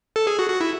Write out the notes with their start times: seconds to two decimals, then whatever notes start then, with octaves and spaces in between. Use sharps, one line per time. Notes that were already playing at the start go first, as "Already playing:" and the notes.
0.16 A4
0.27 G#4
0.39 F#4
0.50 F#4
0.61 E4